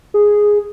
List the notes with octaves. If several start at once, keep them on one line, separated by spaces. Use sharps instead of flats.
G#4